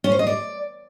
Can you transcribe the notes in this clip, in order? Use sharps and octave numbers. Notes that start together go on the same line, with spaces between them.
C#4
C5
D#5
D5